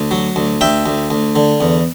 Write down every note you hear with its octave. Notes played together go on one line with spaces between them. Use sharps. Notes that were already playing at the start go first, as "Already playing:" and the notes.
Already playing: D2
F#3
D2
D2 E5 G5
D2
D2
D3
E2